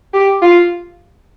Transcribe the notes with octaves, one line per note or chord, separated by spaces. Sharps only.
G4
F4